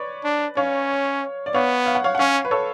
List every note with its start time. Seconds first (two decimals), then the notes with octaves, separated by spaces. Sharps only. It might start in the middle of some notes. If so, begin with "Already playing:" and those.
Already playing: B4 C#5 D5
0.24 D4
0.57 C#4 C#5 F5
1.46 D5
1.54 B3 C#5 F5
1.86 F5
1.95 F#5
2.04 C#5 F5
2.15 F#5
2.19 C#4 C#5 F5
2.45 B4
2.51 A4 C#5